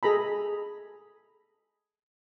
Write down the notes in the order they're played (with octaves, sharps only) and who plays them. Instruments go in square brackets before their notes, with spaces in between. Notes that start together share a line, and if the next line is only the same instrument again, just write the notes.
[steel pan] G#4 A4 A#5 B5